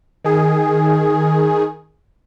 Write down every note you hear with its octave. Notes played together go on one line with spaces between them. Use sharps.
D#3 G#4